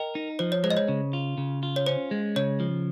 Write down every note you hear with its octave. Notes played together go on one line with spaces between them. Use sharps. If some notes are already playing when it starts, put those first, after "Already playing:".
Already playing: A#4 D#5 G5
D#4
F3 C5
C#5
G#3 C5
D#5
C#5
C#3
F4
C#3
F4
C#5
C#4 C5
G#3
C#3 C#5
F3